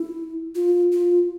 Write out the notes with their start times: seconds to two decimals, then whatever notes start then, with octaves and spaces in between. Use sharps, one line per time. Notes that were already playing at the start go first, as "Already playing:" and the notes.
Already playing: E4
0.55 F4
0.92 F4